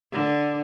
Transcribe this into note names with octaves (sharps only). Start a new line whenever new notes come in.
D3